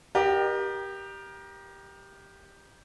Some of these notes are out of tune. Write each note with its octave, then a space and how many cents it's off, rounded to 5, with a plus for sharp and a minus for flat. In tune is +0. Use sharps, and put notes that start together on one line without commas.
G4 +0 A#4 +25 D#5 -45